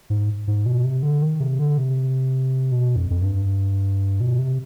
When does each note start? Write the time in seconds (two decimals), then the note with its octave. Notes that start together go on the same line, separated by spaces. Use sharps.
0.10 G#2
0.47 G#2
0.66 B2
0.85 C3
1.03 D3
1.22 D#3
1.40 C3
1.59 D3
1.78 C3
2.72 B2
2.96 F2
3.11 F2
3.21 G2
4.20 B2
4.39 C3